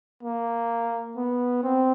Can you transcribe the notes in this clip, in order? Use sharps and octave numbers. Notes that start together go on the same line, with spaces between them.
A#3
B3
C4